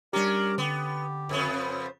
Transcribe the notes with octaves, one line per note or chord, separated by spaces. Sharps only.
G3 C#4 D4 G4 A#4 A#5 D6
D3 B3 G4
F2 C#3 B3
C5